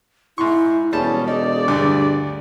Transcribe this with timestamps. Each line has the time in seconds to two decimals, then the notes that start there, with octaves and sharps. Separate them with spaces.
0.38 G#2 E4 C6 C#6
0.93 E1 G3 C#4 G#4 A5
1.28 D#4 D5
1.68 D2 G2